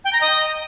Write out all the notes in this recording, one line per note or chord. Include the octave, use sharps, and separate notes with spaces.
G5
A#5
D#5